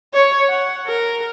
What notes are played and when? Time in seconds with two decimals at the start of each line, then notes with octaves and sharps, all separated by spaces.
0.14 C#5
0.49 F#5
0.87 A#4